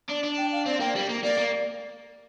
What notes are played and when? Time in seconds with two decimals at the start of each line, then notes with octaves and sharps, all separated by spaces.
0.09 D4 D5
0.24 D4
0.37 G5
0.52 F5
0.66 C4 D5
0.80 A#3 G5
0.95 G3
1.09 A#3
1.23 A#3 D5
1.38 A#3